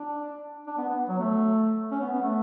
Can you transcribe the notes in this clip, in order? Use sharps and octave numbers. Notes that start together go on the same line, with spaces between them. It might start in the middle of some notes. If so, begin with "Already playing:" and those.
Already playing: D4
D4
B3
B3
F#3
A3
C#4
B3
B3
A3